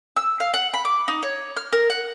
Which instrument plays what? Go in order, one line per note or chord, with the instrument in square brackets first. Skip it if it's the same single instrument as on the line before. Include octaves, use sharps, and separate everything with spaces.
[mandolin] E6
F5
F#5
B5
D6
D#4
C#5
F6
A#4
F#5